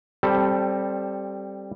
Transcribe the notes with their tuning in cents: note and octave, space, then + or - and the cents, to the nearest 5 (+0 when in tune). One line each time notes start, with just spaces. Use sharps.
G3 +0 C4 +20 A4 +0